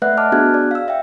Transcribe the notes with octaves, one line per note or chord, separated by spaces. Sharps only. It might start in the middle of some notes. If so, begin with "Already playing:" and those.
A3 B4 D5 E5 F#5 F#6
D#5 A5 D6 F6
B3 D4 F#4 G#4 F#6 G#6
D5
F5 E6
E5 G5